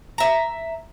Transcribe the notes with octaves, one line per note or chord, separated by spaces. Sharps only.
E5 A#5